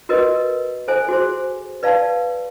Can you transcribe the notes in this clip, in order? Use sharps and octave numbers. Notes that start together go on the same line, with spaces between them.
F#4 A#4 B4 D#5
A4 C5 G#5
F#4 G#4 C5
B4 D5 F5 A5